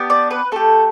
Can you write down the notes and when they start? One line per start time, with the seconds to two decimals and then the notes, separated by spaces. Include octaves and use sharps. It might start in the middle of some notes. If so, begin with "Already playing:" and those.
Already playing: B3 D4 G4
0.10 D5
0.31 B4
0.52 A3 G4 A4